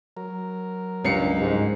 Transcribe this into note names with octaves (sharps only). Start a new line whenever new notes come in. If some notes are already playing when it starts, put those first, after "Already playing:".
F#3 A#4
C#2 G2 C7 C#7
G#2